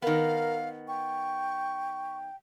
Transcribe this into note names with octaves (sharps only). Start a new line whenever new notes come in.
D#3 B3 A#4 F5
G5 C#6